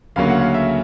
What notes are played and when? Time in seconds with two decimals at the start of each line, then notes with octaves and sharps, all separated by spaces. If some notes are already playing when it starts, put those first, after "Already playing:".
0.16 D2 C#3 F#3 A#3 C#4 F5
0.29 F#5
0.41 F5
0.54 E5